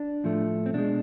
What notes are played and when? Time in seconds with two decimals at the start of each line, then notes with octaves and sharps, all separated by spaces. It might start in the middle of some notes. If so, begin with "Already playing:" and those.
Already playing: D4
0.24 A2 F3 A3
0.66 C4
0.74 B2 G#3 D4